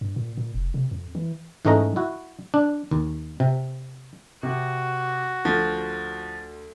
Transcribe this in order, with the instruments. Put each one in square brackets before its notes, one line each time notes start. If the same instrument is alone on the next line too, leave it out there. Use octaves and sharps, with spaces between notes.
[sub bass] G2
A#2
A#2
F1
C3
F2
E3
[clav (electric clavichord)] G#2 E3 A3 C#4 D#5 A#5
E4 F#4
D4
D#2
C3
[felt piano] C3 [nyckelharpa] F#4
[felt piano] D2 [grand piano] F3